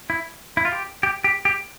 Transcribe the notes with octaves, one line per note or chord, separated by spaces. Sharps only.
E4
E4
F4
G4
G4
G4
G4